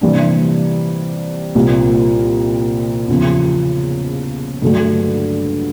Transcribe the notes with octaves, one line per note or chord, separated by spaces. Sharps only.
C3 E3 G3 A#3 D4
C2 A#2 G3 C4 F4
E2 C#3 F3
G2 D3 F#3 A3